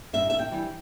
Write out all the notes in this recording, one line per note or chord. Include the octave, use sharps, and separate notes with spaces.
G2 E5
E5
G5
E3 G3